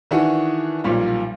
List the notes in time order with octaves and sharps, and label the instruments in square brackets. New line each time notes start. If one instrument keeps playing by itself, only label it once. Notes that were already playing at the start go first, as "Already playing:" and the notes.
[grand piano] D#3 E3 D4 E4 F#4 G#4
B1 A#2 F3 G3 A#3